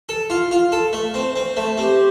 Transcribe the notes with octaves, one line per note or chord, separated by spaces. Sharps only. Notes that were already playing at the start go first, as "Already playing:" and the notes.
A4
F4
F4
A4
A3
C4
C4
A3
C4 G4